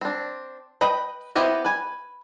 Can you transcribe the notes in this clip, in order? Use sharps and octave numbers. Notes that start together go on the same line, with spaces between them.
C4 D4
B4 D#5 G5 B5
B3 C4 E4 G4 D#5
B4 G#5